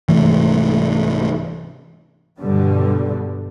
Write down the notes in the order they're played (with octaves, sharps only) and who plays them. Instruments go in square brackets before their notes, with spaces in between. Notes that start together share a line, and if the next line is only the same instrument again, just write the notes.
[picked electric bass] C2 G#2 E3 A3
[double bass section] G2 B2 D3 G3